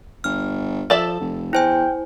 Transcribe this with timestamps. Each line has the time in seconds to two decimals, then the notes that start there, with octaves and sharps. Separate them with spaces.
0.24 G1 F6
0.90 F3 A4 D5 E5
1.20 F1
1.53 E2 E4 C5 G5 G#5